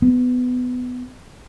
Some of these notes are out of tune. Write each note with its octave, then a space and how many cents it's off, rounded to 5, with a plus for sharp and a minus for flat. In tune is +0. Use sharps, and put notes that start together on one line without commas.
B3 +15